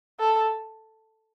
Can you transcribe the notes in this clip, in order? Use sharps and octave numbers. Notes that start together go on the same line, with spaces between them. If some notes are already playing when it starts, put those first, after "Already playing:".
A4